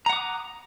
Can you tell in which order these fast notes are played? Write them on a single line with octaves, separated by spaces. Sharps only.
A#5 F#5 D6 D#6